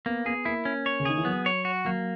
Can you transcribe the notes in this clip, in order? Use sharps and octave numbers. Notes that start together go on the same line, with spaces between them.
A#3 B3
B3 G#4
A#3 E4
C#4
C#5
C#3
D#3 G#4
E3
F#3 B3
C#5
F#4
F#3 A#3